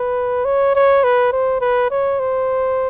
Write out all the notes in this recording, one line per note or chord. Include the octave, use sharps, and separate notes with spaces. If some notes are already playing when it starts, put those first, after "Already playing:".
Already playing: B4
C#5
C#5
B4
C5
B4
C#5
C5